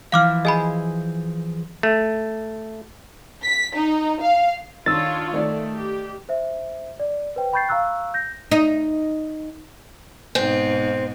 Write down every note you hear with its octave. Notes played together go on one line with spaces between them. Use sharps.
E3 F3 E4 F5 D6 F6
G#4 C5 D#5 G#5 B5
A3
B6
D#4
F5
D#3 D4 F4 C#5 E6 A6
D#3 A3 D5
G4
C5 E5
D5
B4 C5 G5
G5 B5 C#6 G6 A6 C7
F5 A#5 C#6 E6 F#6
G6 A#6
D#4
G#2 B2 C4